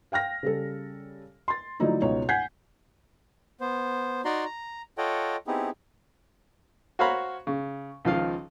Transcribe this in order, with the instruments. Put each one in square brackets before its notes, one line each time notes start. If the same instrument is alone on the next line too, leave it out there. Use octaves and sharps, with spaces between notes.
[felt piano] F5 G5 F6 A#6
C#3 G3 A4
C6 A6
D3 F3 F#3 A3 D#4 E4
C#2 B2 D#4 C#5
F#5 G#5 G6 G#6 B6 C7
[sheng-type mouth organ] B3 C5
D#4 F#4 D5 A#5 C6
A#5
F4 A4 C#5 D#5 F#5 G5
B3 C4 D#4 E4 G4 G#4
[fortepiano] F#4 C5 C#5 F5 A#5 B5
C#3
C#2 D#3 F3 F4 F5